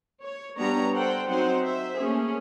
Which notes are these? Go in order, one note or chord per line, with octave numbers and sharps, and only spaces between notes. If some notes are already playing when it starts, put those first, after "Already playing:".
C#5
G3 B3 D4 C#5 A#5
A4 C5 F#5 G5
F#3 C4 D#4 C5 F#5
C5 E5
A3 A#3 C#4 G#4